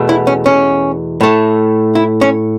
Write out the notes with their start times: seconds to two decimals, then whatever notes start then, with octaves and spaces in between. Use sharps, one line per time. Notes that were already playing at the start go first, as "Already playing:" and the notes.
Already playing: E2 B2 A3
0.09 E4
0.27 C#4
0.46 C#4
1.21 A2 A3
1.95 E4
2.21 C#4